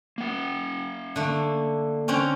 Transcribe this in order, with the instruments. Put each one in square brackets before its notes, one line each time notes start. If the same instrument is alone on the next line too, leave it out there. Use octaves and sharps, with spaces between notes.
[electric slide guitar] A#3 F#5
[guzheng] D3 A3
D3 C4 C#4